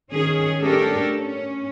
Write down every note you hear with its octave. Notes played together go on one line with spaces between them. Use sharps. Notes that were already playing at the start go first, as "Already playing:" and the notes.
D#3 C#4 G#4
A3 C#4 D4 G4 A4 A#4
C#4